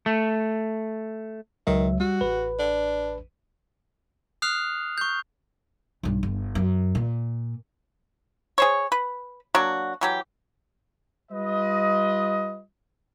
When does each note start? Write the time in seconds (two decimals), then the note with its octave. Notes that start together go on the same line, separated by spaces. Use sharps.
0.06 A3
1.67 C#2 D#3 F#3 E5
2.00 G3 F#4
2.21 A1 B4
2.59 D4
4.42 D#6 F6 F#6 C7 F7
4.98 C#6 G6
6.03 B1 G2
6.23 G1
6.55 F#2
6.95 A#2
8.58 G#4 C5 C#5
8.92 B4
9.55 F#3 A#3 D4 F#4
10.01 E3 F#3 G4
11.31 G3 F4 B4 D#5